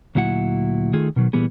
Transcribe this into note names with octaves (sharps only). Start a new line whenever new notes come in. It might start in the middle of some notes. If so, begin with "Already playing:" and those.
D2 A#2 F#3 E4 F#5
D#3 A3 F4 G#4
B2 D#3 F#3
A#2 E3 G3 B3 G#4